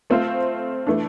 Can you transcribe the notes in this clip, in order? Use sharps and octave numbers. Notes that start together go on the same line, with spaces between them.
A3 C4 F4 C5
E3 A3 D4